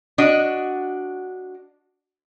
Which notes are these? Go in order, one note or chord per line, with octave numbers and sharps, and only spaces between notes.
D4 F#4 D#5